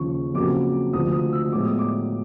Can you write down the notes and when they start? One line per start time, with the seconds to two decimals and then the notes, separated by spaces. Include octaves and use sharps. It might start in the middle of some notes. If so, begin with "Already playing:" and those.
Already playing: D#2 C#3 F3 C#6
0.34 F2 C#3 F#3 A#3 D6
0.93 D2 C3 F3 D#6
1.12 D#6
1.33 E6
1.52 A2 F3 G#3 B3 D6
1.65 D#6
1.78 D6